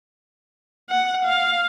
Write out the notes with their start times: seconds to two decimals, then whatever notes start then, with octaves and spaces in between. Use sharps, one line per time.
0.90 F#5
1.25 F5